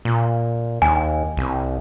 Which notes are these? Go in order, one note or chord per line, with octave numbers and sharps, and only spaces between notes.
A#2
D#2 G#5
C2